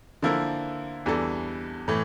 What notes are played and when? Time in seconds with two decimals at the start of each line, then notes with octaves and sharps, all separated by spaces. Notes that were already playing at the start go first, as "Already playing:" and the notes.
0.22 D3 F3 A#3 E4 A#4
1.06 E2 E3 G3 D4 A4
1.88 A2 E3 A3